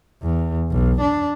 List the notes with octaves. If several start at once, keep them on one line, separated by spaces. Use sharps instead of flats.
E2
B1
D4